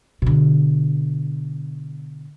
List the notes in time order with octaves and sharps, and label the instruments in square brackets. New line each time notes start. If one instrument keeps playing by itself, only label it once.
[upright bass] B2 D3